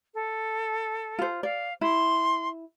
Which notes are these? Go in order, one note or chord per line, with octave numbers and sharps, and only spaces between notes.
A4
F4 C5
D5 F5
E4 C6